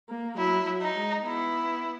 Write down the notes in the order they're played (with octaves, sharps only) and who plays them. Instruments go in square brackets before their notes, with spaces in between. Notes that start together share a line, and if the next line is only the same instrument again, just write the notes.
[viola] A#3
[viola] F#3 [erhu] E4
[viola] F#3
[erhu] D#4
[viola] G#3
[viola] B3 [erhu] E4